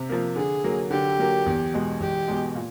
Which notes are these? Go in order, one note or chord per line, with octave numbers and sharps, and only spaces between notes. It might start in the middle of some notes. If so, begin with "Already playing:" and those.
Already playing: C3
F3 A#3
D3 G#4
F#3 A#3
D3 G4
F#3 A#3
E2
B2 G#3
E2 G4
B2 G#3
A#2